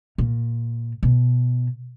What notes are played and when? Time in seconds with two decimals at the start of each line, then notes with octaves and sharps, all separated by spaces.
0.18 A#2
1.03 B2